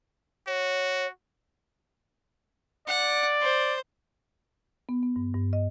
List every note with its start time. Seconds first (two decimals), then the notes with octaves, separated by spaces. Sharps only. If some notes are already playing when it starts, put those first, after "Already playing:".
0.47 F#4 C#5
2.88 D5 F#5
3.42 C5
4.89 B3
5.03 B3
5.16 G2
5.35 G2
5.53 D#5